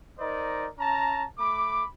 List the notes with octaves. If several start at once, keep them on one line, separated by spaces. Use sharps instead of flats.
D#4 A#4 C5 D5 D#5
C#4 A5 A#5
A3 B5 D6